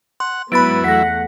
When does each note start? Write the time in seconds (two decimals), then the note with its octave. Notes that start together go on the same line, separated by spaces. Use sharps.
0.20 F#5 C6
0.52 G#2 F#3 B3 E4 B4 B5 A6 D7
0.84 E2 A3 F#5 A#6 B6